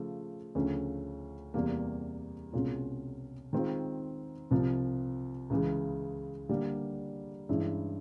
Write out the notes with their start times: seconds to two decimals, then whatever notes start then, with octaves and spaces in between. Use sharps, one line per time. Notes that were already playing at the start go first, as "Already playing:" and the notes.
Already playing: C#3 F3 A3
0.55 D2 C#3 F3 A3 C#4
1.54 E2 C3 E3 G3 A#3
2.53 C2 B2 G#3 C#4 F4
3.53 D#3 G#3 C4 F4
4.51 C2 C3 F3
5.50 C#2 C#3 E3 G#3
6.49 D3 G3 A#3
7.49 G2 E3 G#3 C#4 E4